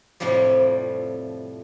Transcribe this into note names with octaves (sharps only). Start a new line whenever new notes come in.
F2 A2 C3 F3 G3